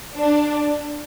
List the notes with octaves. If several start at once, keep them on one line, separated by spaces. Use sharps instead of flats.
D4